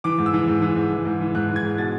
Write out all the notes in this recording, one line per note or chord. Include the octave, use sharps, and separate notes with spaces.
E3 D6
G#2
E6
E3
G#2
E3
G#2
E3
G#2
E3
G#2 F#6
E3
G#6
G#2
B2 A6